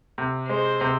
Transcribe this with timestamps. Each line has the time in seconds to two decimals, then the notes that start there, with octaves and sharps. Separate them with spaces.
0.18 C3
0.49 G#3 C5
0.81 C3